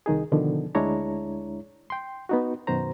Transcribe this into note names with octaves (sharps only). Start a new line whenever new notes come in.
C2 D#3 D#4 G#4
B2 D3 D#3 F3 B3
D2 G#3 D4 E4 C#5 A#5
G5 C6
B3 D#4 F#4
F#2 B2 D#3 F#4 C5 A#5